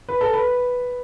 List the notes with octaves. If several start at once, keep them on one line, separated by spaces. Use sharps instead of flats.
B4
A4
B4